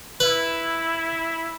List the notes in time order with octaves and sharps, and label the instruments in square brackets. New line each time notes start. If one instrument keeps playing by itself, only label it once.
[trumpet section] E4 [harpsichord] B4